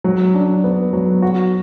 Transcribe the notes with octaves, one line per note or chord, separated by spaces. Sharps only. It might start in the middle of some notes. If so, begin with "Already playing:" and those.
F#3
D4
B3
F#3
F#4